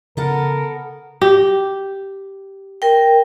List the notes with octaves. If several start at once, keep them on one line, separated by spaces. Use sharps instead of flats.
C#3 B3 A4 A#4 F#5
G4
A#4 G5